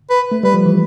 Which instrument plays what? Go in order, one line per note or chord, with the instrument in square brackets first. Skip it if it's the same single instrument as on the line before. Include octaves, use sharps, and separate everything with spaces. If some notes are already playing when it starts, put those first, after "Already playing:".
[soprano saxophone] B4
[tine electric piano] A3
[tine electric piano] G3 [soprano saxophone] B4
[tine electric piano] F3
E3